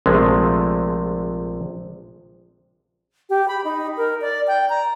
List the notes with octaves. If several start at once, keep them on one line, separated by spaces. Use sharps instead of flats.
A#1 C3 F3 G#3 A3
G4
B5
D#4
A#4
D5
G5
A#5